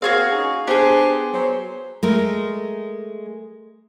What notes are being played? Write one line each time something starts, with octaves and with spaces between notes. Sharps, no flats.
A#3 C4 F#4 G#4 C#5 F5
C#4 D#4 G#4
B3 D4 G4 G#4 C5
F#3 C5
G#3 A3 A#4